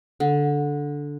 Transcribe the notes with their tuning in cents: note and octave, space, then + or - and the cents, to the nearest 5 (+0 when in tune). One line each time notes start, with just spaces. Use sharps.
D3 -10